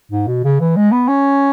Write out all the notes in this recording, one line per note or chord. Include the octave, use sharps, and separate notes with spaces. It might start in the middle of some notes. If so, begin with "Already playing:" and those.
G#2
B2
C#3
E3
G#3
B3
C#4